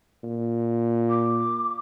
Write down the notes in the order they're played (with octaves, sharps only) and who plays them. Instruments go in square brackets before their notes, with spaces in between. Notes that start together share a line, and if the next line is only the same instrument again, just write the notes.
[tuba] A#2
[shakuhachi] D6